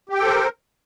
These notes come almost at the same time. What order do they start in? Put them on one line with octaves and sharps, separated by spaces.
G4 G5 A4 C5 A#4